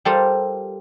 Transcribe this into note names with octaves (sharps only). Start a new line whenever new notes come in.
G3 F4 G4 A4 A#4 C5